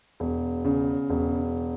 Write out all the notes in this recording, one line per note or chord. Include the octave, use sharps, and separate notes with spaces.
E1
C#3
E1